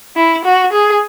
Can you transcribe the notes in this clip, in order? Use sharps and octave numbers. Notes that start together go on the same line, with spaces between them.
E4
F#4
G#4